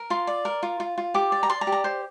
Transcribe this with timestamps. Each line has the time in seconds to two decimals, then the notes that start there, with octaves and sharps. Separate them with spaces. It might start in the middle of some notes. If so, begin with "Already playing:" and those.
Already playing: A#4
0.10 F4 C6
0.27 D5
0.45 A#4
0.63 F4
0.80 F4
0.98 F4
1.14 G4 D6
1.32 D5
1.43 A#5
1.50 D5 C6
1.61 A#5
1.67 G4
1.72 A#5
1.84 C5